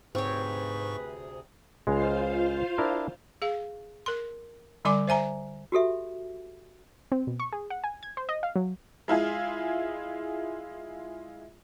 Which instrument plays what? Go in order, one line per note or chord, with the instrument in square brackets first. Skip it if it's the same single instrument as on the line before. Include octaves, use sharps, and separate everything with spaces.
[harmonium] D2 C3 G#4 [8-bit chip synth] G#2 C#6 [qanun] C4 C#5 [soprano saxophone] B4
[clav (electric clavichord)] C#2 G#3 [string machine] F4 C5 F5
[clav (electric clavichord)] D4 E4 A#4
[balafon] G#4 F5
A#4 C6
D3 G3 D5 G#5 C6 D6
C5 E5 G#5 A#5
[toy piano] F#4 G4 A4 E5
[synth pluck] C4
B2
C#6
G#4
F#5
G#5
G#6
C5
D#5
F5
F#3
[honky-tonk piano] G#3 E4 F4 G#4